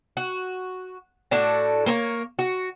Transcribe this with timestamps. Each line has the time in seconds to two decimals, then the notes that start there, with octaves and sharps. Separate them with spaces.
0.17 F#4
1.31 A2 D4 F#4 A4
1.86 A#3 A#4 C5 C#5
2.39 F#4